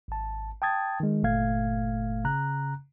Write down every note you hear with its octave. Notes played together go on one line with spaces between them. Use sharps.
G#1 A5
G5 A5 D#6 G#6 A6
D#3 G#3
G1 A#2 A3 F5 G#6
C#3 A#5 F#6